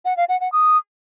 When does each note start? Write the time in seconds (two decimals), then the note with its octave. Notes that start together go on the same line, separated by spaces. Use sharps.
0.05 F#5
0.17 F5
0.29 F#5
0.41 F#5
0.52 D#6